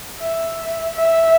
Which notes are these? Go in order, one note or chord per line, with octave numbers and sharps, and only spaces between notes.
E5
E5